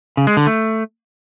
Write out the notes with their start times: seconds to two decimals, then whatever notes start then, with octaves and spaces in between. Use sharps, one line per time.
0.17 C#3
0.27 G#3
0.37 D3
0.47 A3